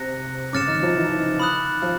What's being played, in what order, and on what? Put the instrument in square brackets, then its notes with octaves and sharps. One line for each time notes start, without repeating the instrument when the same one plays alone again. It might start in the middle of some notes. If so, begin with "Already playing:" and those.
Already playing: [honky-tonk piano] C3 C4 [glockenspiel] F#6 A#6 C#7
[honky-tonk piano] C#3 C#4 [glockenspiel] D6 F6 A6 C#7 E7
[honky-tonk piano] D#3 D#4
F3 F4
E3 E4
[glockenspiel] B5 D#6 F#6
[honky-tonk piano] F3 F4